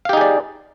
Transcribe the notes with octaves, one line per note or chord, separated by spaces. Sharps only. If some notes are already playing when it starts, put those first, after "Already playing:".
D#4 G4 G#4 D5 F5